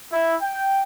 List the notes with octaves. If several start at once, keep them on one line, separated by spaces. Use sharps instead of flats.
E4
G5